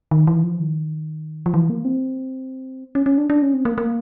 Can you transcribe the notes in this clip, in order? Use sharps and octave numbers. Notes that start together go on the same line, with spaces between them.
D#3
E3
F3
D#3
F3
E3
A#3
C4
C#4
C#4
D4
D4
C#4
C4
A#3
A#3